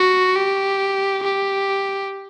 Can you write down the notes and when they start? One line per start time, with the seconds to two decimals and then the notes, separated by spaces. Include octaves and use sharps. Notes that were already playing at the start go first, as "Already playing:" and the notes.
Already playing: F#4
0.36 G4
1.23 G4